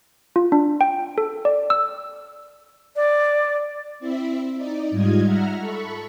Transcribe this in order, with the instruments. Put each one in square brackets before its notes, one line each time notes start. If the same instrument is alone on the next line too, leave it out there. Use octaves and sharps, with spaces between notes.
[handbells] F4
D4
G5
A4
D5
E6
[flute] D5
[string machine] C4 E4 E5
D#4 D5
G#2 G3 F4 D#5 G#6
E5 F#5 A#5 F6
A4 B5 C#6